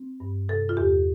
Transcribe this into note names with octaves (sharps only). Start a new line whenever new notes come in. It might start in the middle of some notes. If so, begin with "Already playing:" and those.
Already playing: C4
G2
C3 A4
F4
E2 G4